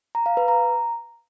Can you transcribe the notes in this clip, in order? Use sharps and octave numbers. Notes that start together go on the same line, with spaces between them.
A#5
F5
B4
A#5